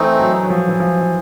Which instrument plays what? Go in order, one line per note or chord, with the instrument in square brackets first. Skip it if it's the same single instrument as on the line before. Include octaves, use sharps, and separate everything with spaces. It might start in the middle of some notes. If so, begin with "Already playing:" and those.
Already playing: [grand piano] E3 [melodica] A3 C4 D#4
[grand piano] F#3
F#3
F3
E3
F3
E3